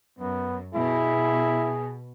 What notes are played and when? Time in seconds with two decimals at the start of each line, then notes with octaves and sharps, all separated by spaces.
0.19 F#2 B3
0.75 B2 E4 G#4